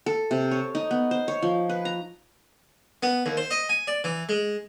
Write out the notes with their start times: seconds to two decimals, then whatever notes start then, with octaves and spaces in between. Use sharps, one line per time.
0.06 A4
0.31 C3
0.51 C#5
0.75 D#4
0.91 B3
1.11 C5
1.28 C#5
1.42 F3
1.69 B4
1.85 A#5
3.03 B3
3.26 D#2
3.37 C5
3.51 D#5
3.69 G#5
3.87 D5
4.04 E3
4.29 G#3